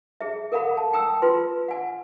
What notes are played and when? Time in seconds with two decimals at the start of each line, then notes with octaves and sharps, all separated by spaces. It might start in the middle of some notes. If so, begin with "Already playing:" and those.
0.21 G#4 E5
0.52 A4 A#4 F5 F#5 B5
0.77 A5
0.93 G5 A#5 D#6 E6
1.22 F4 B4 C6
1.68 F#5 G#5